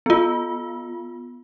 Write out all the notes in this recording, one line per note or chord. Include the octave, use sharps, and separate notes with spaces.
B3 F4